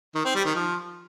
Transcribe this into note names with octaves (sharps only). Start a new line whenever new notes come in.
D#3
C4
G3
D#3
F3